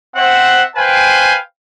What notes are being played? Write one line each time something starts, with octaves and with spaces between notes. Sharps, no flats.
C4 C5 E5 F#5
B4 C5 F5 G5 G#5